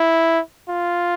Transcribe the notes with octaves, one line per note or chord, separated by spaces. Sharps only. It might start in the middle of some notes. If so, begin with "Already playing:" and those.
Already playing: E4
F4